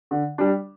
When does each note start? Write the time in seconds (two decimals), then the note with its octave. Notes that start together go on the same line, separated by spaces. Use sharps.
0.11 D3
0.38 G3 D4